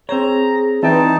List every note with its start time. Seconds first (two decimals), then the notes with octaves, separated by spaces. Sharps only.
0.09 C4 G#4 C5 C#5 A#5
0.83 E3 C4 D#4 D5 G5 A5